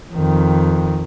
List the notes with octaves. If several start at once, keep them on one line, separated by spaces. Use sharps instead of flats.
F2 D#3